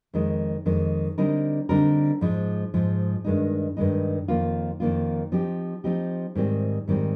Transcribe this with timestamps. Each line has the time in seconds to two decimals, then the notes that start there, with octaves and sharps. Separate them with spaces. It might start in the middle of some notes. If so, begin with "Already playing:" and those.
0.14 F2 D#3 G#3
0.66 F2 D#3 G#3
1.18 D3 G3 C4 D#4 A#4
1.69 D3 G3 C4 D#4 A#4
2.21 G#2 F3 G#3
2.74 G#2 F3 G#3
3.24 G2 D#3 G#3 D#4
3.77 G2 D#3 G#3 D#4
4.28 F2 D#3 A#3 F4
4.80 F2 D#3 A#3 F4
5.32 F3 C4 D#4 G4
5.84 F3 C4 D#4 G4
6.35 G#2 D#3 G3 C4
6.88 G#2 D#3 G3 C4